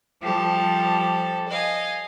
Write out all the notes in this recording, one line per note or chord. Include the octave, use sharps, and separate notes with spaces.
F3 G3 G4 A4
D#5 F5 G#5